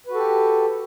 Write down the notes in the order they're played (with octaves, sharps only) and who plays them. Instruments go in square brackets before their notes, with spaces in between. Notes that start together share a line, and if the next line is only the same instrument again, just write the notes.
[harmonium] B4
F#4
A4
G4